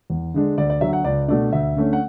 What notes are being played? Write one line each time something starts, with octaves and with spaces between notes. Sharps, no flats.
E2
D3 G#3 D4
D2 D5
D5
D3 F#3 E5
F#5
C#2 D5
B2 A3 D4 D5
D2 E5
D3 A3 C#4
F#5